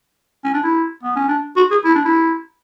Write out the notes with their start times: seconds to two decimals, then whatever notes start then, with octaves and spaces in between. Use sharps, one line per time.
0.44 C#4
0.54 D4
0.63 E4
1.03 B3
1.16 C#4
1.28 D4
1.56 F#4
1.71 G#4
1.84 E4
1.95 D4
2.05 E4